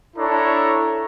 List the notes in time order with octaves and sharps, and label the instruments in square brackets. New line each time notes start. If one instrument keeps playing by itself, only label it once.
[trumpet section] D4 E4 A4 C#5 A#5